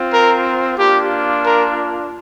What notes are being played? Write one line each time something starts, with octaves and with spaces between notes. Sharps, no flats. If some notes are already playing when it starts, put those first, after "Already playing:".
Already playing: C4 F4
A#4
A#3 D4 F4 G4
A#4